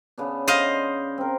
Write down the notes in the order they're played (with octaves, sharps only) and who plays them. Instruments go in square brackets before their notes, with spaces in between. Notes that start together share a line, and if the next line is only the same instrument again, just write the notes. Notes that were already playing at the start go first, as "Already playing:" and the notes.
[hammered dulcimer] C#3 B3 D4
[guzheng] C5 D#5 F5
[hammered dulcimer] C4 A#4